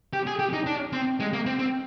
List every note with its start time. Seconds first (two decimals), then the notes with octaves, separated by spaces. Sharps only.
0.13 G4
0.27 G#4
0.39 G4
0.53 D#4
0.66 D4
0.93 C4
1.20 G#3
1.33 A#3
1.46 C4
1.59 C4